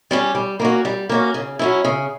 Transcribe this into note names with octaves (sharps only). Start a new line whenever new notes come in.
G3 C#4 G4
G3
A#3 C#4 F#4
G3
A#3 C#4 F#4
C#3
F#3 C#4 E4
C#3